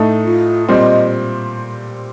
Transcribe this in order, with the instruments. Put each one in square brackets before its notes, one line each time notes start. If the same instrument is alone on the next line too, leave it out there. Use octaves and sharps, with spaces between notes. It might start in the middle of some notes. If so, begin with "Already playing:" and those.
Already playing: [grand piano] A2 A3 D#4
[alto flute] F4
[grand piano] A#2 G3 C4 [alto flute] D#5